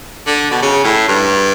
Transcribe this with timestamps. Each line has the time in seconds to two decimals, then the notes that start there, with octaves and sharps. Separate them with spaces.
0.27 D3
0.51 B2
0.62 C#3
0.84 A2
1.08 G2